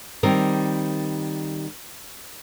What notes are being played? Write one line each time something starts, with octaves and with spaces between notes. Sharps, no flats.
D#3 G3 C4 A#4